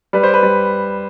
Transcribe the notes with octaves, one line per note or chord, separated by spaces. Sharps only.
G3 B4
C5
B4
G3